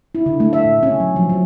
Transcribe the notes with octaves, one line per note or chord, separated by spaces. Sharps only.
E4
D3
A3
E5
A#2
C#4
F#3
F3
F#3